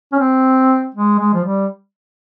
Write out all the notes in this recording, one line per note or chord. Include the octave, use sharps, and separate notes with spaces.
C#4
C4
G#3
G#3
F3
G3